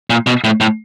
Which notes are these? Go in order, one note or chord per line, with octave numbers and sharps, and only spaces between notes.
A#2
B2
A2
A2